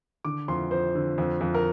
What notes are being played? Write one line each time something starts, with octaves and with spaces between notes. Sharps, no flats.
D3 D6
F2 C6
F2 C5
D3
F2
F2
A#4